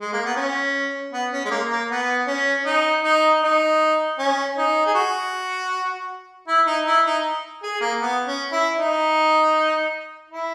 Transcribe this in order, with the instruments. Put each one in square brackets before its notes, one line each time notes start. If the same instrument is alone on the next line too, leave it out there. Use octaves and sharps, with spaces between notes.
[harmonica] G#3
A#3
B3
C#4
B3
C#4
G#3
A#3
A#3
B3
C#4
D#4
D#4
D#4
C#4
D#4
G#4
F#4
E4
D#4
E4
D#4
G#4
A#3
B3
C#4
E4
D#4
E4